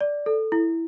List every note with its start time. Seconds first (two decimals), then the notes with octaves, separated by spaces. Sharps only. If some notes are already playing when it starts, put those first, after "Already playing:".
0.01 D5
0.26 A4
0.52 E4